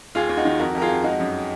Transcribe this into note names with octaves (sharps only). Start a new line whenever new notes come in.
D#2 F4 G#4
D#2
D#4 F#4
D#3
F2 F#4 A#4
F2 A#4
F4 G#4
F2
G#3 D#4 F#4
F#2